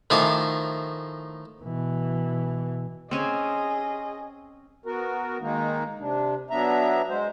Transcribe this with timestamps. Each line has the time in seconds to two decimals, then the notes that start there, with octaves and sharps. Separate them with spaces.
0.10 A2 D#3 F3 G#5 D6
1.62 B2 E3
3.11 C4 C#4 G#4 D#5 G#5
4.86 B3 F#4 A#4
5.41 D#3 G#3 A#3 D#4
5.99 C3 D4
6.50 F#3 B3 D4 E5 A#5
7.10 G#3 C5